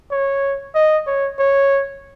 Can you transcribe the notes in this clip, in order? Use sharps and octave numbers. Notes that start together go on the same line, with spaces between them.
C#5
D#5
C#5
C#5